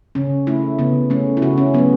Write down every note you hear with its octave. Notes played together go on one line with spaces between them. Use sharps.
C#3 C#4
A3 E4
C#3 B3
A3 C#4
E4
C#3 F#4
C#4
F#3 A3 B3